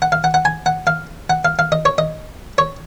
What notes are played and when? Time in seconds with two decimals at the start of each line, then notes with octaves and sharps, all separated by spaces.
0.02 F#5
0.12 F5
0.24 F#5
0.34 F#5
0.45 G#5
0.66 F#5
0.87 F5
1.30 F#5
1.45 F5
1.59 F5
1.72 D#5
1.85 C#5
1.98 D#5
2.58 C#5